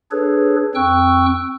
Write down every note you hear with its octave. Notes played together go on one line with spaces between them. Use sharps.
D4 G#4 A4 B4 C#5
F2 C4 G5 C#6 E6 F#6